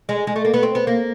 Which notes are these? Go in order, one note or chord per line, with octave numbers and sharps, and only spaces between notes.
G#3
G#3
A3
A#3
B3
C4
B3
A#3